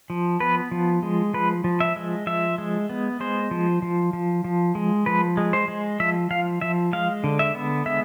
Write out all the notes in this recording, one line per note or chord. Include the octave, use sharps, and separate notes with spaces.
F3
B3 B4
F3
G#3
F3 B4
F3
E5
G#3
F3 E5
G#3
B3
G#3 C5
F3
F3
F3
F3
G#3
F3 B4
G#3
C5
G#3
F3 E5
F3 F5
F3 E5
G#3 F5
D3
E5
B3
G#3 E5